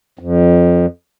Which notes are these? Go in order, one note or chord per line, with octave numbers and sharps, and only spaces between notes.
F2